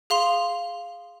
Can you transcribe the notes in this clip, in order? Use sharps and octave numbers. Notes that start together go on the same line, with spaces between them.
G#4 F5 C6 F7